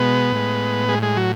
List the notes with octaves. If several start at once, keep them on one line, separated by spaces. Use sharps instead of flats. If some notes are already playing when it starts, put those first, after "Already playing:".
Already playing: B2 G#3 B3 B4
A2 G#3
G#3 G#4
G#3 G#4
F#3 F#4